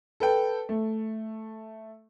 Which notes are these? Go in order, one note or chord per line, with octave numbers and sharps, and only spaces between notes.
A4 B4 G5
A3